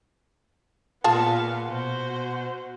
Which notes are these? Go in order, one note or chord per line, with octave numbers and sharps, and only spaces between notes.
A#2 B3 F4 G#4 F5 A5
B2 F#4 C5